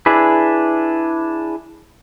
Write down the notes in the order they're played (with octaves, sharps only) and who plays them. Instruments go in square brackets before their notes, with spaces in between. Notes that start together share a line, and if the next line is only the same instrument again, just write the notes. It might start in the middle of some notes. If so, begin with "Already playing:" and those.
[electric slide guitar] D4 E4 G#4 B4